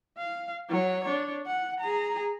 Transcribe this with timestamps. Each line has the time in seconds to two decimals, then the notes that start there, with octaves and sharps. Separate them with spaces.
0.18 F5
0.69 F#3 C#5
1.04 D4 C#5
1.47 F#5
1.80 G#4 A#5